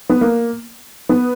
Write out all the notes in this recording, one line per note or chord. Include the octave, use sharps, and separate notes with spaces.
B3
A#3
B3